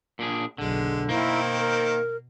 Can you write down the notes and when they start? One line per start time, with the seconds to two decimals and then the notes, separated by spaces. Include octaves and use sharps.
0.19 A#2 D4 G#4
0.58 F#1 B1 D3 G#3
1.09 B2 D#3 A#3 C4 E4
1.58 A#4